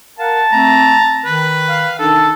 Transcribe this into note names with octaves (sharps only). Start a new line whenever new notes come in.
A#4 F5 F#5 A5
A3 C4 A#5
D#3 B4
F5
D#3 D4 D#4 A4